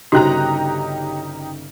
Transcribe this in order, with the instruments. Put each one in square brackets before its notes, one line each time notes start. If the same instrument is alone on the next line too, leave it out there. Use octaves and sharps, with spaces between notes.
[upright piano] G1 C#3 F#6 [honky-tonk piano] D#4 G4 A#5 [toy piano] F#4 C5